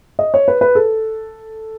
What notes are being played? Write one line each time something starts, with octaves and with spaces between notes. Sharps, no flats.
D#5
C#5
B4
B4
A4